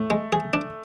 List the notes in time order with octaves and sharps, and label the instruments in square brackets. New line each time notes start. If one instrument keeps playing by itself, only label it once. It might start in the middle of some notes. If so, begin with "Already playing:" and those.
Already playing: [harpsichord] A2 [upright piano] A3
[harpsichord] G#3
G#4
D4